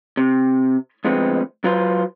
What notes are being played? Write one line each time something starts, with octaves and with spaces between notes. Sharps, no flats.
C3
D2 F3 G#3 B3 C4
F#3 F4 B4 C5